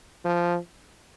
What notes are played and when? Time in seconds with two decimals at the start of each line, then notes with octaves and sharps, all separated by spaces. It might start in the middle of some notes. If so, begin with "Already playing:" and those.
0.25 F3